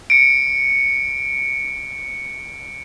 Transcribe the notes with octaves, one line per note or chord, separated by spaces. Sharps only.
C#7 D7